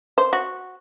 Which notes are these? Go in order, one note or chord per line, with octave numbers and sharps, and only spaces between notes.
C5
F#4